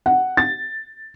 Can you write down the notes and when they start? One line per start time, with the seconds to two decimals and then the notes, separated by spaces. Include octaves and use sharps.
0.06 F#5
0.37 A6